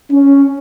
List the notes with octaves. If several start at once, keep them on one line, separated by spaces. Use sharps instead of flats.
C#4